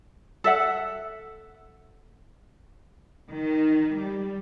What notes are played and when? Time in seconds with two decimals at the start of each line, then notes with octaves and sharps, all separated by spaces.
0.44 A4 E5 F#5
3.30 D#3
3.97 G3